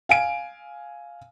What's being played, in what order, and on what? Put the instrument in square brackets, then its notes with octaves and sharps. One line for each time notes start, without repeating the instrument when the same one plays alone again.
[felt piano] F5 G#5 D7